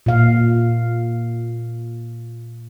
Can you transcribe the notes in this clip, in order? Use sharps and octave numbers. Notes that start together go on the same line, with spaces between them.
A#2 F5